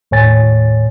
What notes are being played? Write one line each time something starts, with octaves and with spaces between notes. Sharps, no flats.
D#2 A2 C#5 G#5 A6